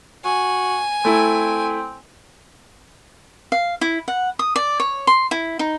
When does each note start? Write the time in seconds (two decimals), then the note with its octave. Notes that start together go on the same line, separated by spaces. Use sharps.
0.25 F#4 G#5
1.05 A3 C4 E4
3.52 F5
3.81 E4
4.08 F#5
4.39 D#6
4.56 D5
4.80 C#5
5.07 C6
5.31 E4
5.59 D#4